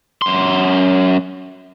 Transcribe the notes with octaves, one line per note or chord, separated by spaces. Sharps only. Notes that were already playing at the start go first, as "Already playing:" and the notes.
F#2 C6